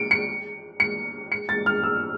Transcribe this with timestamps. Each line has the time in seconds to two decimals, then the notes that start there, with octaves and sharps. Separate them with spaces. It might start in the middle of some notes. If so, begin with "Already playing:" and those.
Already playing: C#7 D7
0.11 C#7
0.80 C#7
1.32 C#7
1.49 A6
1.66 F6
1.83 E6